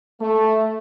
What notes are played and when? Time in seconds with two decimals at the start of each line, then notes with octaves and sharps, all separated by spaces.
0.20 A3